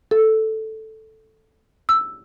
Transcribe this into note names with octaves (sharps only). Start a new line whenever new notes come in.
A4
E6